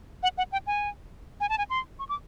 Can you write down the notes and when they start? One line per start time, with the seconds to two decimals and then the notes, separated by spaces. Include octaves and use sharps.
0.23 F#5
0.38 F#5
0.52 G5
0.67 G#5
1.40 G#5
1.49 A5
1.58 G#5
1.70 C6
1.99 C#6
2.09 D6